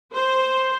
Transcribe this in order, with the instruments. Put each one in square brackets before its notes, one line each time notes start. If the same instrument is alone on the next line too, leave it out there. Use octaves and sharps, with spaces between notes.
[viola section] C5